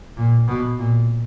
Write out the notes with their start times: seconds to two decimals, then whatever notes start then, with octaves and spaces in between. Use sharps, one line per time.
0.17 A#2
0.48 B2
0.79 A#2